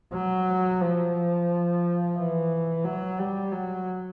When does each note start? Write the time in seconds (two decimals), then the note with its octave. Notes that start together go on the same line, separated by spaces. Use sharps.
0.13 F#3
0.81 F3
2.17 E3
2.84 F#3
3.19 G3
3.52 F#3